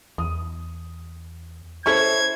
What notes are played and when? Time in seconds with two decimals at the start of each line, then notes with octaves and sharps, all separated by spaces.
0.18 E2 D#6
1.86 C#4 E4 A4 C5 C#6 G#6